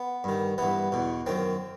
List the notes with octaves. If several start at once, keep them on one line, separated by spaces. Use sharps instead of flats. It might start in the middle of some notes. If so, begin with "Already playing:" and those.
Already playing: B3
G2 D#3
G2 E3 B3
E2 B2
F#2 D#3 C4